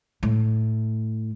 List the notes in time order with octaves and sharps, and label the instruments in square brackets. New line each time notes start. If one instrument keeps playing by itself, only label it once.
[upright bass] A2